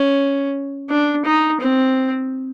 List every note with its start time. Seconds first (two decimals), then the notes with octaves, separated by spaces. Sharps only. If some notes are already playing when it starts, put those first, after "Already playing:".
Already playing: C#4
0.90 D4
1.25 D#4
1.60 C4